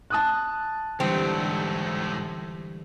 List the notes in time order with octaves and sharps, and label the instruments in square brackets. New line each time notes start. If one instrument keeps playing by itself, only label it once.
[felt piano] A5 D#6 F#6
[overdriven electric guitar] G#2 A3 [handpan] D3 E3 G3 [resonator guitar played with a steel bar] C4